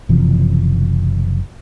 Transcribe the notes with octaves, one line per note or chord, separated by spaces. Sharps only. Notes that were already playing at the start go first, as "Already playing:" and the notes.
F#1 C3 E3 F3